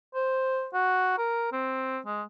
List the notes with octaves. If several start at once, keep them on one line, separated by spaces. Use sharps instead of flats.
C5
F#4
A#4
C4
G#3